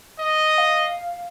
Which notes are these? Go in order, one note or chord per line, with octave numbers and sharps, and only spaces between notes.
D#5
F5